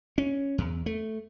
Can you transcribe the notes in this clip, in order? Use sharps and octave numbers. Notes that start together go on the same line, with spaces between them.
C#4
E2
A3